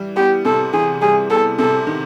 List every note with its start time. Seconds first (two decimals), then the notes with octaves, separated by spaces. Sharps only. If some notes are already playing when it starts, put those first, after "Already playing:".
Already playing: E3 G3
0.16 B3 G4
0.45 C3 A4
0.73 E3 G#4
1.02 G3 G#4
1.30 B3 A4
1.59 C3 A4
1.87 D#3